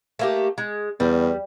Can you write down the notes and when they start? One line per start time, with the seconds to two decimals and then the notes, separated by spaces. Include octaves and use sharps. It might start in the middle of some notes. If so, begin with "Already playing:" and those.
0.19 A3 A#3 G4
0.58 G#3
1.00 E2 G3